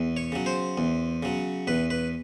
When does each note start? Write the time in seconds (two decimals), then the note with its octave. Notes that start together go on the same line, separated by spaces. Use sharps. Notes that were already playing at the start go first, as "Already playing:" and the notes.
Already playing: E2
0.17 C#5
0.32 C#3 F#3
0.46 C5
0.78 E2
1.23 C#3 F#3
1.67 E2 B4
1.90 B4